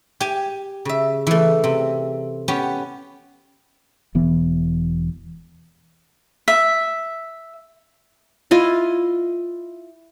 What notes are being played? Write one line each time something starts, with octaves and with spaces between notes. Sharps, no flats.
G4 G#5
C#3 E5
E3 A3
C3
B3 C#4 G4
E1 E3 B3
E5
E4 F4 D#5